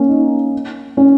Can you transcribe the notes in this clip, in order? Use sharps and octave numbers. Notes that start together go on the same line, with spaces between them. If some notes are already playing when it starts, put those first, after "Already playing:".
Already playing: A#3 C#4
D#4
C#4